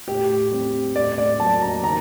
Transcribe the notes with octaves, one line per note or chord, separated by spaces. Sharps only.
A2 G4
G3 C4
A2 D5
D5
F#3 A#3 A5
A#5
D#3 A#5